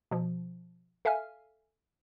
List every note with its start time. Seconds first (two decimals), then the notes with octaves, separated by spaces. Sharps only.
0.11 B2 F3
1.05 A4 E5 F5 G#5 F6